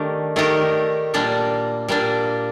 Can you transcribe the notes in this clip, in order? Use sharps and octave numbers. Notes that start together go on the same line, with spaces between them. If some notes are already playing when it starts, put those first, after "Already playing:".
Already playing: D#3 A3 D4 G4 A#4
D#3 A3 D4 G4 A#4
A#2 G3 A#3 D4
A#2 G3 A#3 D4